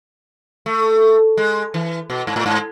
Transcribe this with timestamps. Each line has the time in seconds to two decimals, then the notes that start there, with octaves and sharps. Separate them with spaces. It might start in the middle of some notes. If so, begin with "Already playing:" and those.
0.66 A3
1.38 G#3
1.74 E3
2.10 B2
2.27 G#2
2.36 A2
2.46 G#2